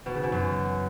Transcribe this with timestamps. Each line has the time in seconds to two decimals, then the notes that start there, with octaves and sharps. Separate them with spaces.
0.06 B2
0.15 C#3
0.23 B2
0.32 F#2